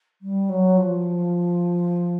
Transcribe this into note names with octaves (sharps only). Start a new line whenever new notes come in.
G3
F#3
F3